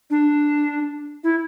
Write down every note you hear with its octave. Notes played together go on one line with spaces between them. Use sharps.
D4
E4